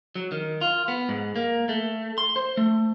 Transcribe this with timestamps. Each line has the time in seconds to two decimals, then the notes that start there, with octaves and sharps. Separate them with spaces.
0.15 F#3
0.32 D#3
0.61 F4
0.88 B3
1.09 G#2
1.36 A#3
1.69 A3
2.18 C6
2.36 C5
2.57 A3